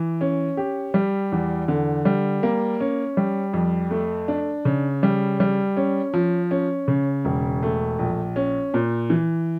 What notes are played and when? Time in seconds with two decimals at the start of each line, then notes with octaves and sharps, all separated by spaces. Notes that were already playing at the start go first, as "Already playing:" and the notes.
Already playing: E3
0.21 C#4
0.57 G4
0.94 G3
1.32 E2
1.68 D3
2.05 G3
2.43 A#3
2.80 C#4
3.17 G3
3.53 F2
3.91 A3
4.28 D4
4.65 C#3
5.03 G3
5.40 G3
5.77 C#4
6.14 F3
6.51 C#4
6.88 C#3
7.25 E1
7.63 A3
7.99 A#1
8.36 C#4
8.74 A#2
9.10 E3